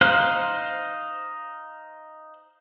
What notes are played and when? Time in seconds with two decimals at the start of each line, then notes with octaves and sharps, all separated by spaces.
0.01 D#4 C5 F5 F#6